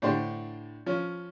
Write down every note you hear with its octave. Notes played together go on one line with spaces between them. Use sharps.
A2 D3 D4 G4 C5
F3 C#4